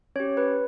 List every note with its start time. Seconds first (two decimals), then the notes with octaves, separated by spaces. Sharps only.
0.16 C#4 G4 C#5
0.37 B4